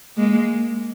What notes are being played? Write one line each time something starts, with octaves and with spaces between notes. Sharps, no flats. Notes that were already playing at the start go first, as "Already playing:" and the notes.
G#3 A#3